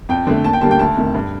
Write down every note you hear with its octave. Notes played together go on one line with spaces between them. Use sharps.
F2 G5
D3 A3
D#2 A5
G5
D3 G3 A#3 A5
G5
D2 A5
C3 D#3 A3
G2